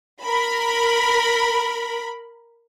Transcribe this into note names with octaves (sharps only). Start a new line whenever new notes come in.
A#4 B5